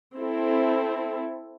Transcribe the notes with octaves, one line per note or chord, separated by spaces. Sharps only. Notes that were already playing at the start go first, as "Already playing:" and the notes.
C4 E4 A4